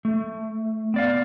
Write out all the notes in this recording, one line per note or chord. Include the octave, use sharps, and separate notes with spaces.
A3
B3 D5 F5